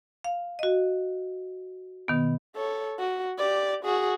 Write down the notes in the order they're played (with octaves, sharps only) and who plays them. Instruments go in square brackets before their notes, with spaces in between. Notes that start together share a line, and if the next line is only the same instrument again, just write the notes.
[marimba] F5
F#4 D#5
B2 D#3 B3
[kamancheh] A4 C#5
F#4
G4 D5
F#4 G#4